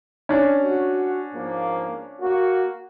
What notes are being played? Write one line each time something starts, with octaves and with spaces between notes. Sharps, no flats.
C#4 D4
F#4
G#2 F3 A#3
A#3 F#4